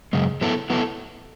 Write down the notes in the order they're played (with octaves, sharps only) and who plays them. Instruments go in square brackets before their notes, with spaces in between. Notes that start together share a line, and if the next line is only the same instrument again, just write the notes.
[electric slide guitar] F#2 C#3 G#3
F#3 B3 E4 A4
F#3 B3 E4 A4